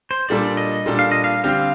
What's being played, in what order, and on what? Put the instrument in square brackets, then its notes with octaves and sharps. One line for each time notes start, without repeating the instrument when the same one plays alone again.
[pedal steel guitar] C5
[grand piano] A#2 G3 D4 A4 [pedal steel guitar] D5
[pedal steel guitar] D#5
[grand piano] A#2 G3 D4 A4
[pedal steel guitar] F5
D#5
F5
[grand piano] D3 G3 C4 G4 C5 [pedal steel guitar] F5